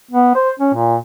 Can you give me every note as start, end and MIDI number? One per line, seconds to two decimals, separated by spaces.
0.11 0.32 59
0.35 0.50 72
0.59 0.72 61
0.74 0.96 46